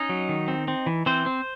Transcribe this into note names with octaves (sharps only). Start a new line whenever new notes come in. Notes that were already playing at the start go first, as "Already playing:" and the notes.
Already playing: C#4 D#4 D#5
F#3
D#3
C4
C4
E3
E3 C4 C5
C4